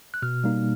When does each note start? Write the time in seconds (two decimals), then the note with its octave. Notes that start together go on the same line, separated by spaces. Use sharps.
0.14 F#6
0.22 B2 F6
0.44 G3 A#3 D#4